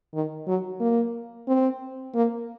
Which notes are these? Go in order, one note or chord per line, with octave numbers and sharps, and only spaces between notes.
D#3
F#3
A#3
C4
A#3